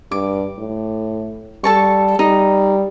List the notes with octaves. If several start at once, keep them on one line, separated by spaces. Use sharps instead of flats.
G2 D6
A2
G3 A4 A5 C#6
G3 D#4